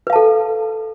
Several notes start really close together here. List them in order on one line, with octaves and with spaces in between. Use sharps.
B4 F5 A5 A4